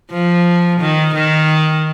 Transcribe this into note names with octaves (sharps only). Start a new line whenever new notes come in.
F3
D#3
D#3